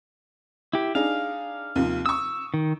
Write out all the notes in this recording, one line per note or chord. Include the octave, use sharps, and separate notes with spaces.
E4 G4
D4 D#4 G#4 F5
D#2 C3 F3
C#6 D#6 E6
D#3